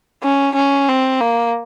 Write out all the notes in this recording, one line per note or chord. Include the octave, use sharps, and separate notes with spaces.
C#4
C#4
C4
A#3